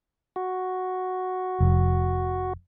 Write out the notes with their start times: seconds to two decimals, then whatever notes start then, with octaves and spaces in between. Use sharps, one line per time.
0.36 F#4
1.60 F1